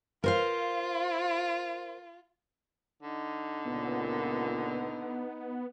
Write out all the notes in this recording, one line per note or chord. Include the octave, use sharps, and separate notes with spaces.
F4 A#4 C5 F5
D3 D#4
C#2 A#2 B3